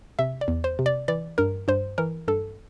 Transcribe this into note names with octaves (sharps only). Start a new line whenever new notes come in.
C3 E5
D5
E2
C5
C3
D5
E3 D5
G2 A#4
G2 C5
E3 A#4
G2 A4